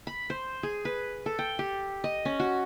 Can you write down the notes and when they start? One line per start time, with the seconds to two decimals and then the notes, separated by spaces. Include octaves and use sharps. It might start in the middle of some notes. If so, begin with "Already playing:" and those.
0.07 B5
0.30 C5
0.63 G#4
0.85 B4
1.26 A4
1.39 G5
1.59 G4
2.04 D#5
2.25 C#4
2.40 F#4